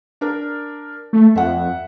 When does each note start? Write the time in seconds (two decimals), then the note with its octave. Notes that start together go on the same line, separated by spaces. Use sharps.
0.21 D4 A#4
1.13 A3
1.35 F2 E5 F#5